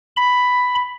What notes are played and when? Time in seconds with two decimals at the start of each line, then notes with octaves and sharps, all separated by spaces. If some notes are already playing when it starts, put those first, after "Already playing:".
0.17 B5